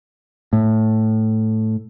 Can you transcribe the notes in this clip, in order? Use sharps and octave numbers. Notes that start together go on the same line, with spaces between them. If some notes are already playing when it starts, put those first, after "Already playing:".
A2